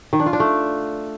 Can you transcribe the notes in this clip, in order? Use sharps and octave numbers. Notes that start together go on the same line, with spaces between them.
D#3
D4
F4
D4
A3